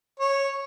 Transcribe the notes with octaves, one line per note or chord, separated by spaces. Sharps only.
C#5